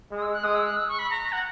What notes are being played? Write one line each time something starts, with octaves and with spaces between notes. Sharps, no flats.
G#3 D#6
E6
F#6
G#3 D#6
E6
F#6
E6
C#6
B5
A#5
A#5
F#5